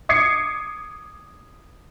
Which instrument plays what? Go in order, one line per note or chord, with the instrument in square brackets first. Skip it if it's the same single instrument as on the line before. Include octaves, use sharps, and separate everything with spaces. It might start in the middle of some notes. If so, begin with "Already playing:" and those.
[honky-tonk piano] D6 D#6 G#6 C7 C#7